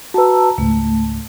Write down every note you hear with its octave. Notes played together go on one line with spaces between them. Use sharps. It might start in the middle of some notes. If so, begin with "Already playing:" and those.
F#4 B4 A5 A#5 E6
C#2 G#2 A3